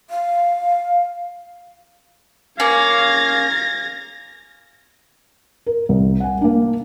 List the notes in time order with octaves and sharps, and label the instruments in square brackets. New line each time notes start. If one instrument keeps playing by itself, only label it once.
[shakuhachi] F5
[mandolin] A#3 C#4 [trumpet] F5 [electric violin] G#6 A#6
[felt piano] A#4
C2
F#5 G#5
A#3 D4